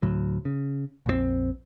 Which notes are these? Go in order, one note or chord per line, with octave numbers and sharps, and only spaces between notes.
D2 A2 F#3
C#3
A#1 F2 E3 C4